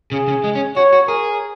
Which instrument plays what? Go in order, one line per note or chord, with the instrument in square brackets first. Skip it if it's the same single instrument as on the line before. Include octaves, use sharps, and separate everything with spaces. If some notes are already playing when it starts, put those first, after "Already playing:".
[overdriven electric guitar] C#3 [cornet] G#4
[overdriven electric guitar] C#3
G#3
C#4
[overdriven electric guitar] F#4 [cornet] C#5
[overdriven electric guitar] F#4
[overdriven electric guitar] G#4 [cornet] A#4